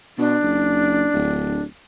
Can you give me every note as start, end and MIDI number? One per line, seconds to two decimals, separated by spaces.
0.18 0.38 47
0.18 1.62 62
0.42 1.08 30
1.14 1.65 26